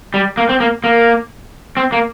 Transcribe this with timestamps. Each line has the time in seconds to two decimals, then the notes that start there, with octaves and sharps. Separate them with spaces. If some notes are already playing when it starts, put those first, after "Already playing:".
0.14 G3
0.37 A#3
0.49 C4
0.60 A#3
0.84 A#3
1.77 C4
1.92 A#3